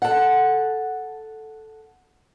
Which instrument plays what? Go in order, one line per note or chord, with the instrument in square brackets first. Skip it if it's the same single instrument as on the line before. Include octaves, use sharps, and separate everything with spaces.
[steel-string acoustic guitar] A4 F#5